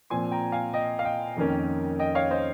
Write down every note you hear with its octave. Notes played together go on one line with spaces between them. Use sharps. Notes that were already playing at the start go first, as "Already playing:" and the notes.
A#2 F3 C4 G#5 C6
G5 A#5
F5 G#5
D#5 G5
F5
D#5 G5
F2 D#3 A#3 C#4
D#5 G5
C#5 F5
C5 D#5